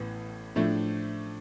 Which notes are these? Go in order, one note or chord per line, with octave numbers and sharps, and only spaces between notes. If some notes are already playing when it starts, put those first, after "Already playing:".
Already playing: A1 A2 E3 B3
A2 F3 A3 D4